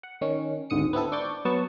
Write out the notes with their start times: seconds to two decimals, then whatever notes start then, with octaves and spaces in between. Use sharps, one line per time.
0.03 F#5
0.21 D#3 C#4
0.70 G#1 D2 G#2 D#6 C#7
0.93 B3 C4 E4 A4
1.12 D4 C#6 D6 G6 A6
1.45 F#3 B3 A5 C#6